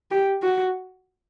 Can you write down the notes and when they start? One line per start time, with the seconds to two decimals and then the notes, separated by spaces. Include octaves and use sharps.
0.11 G4
0.43 F#4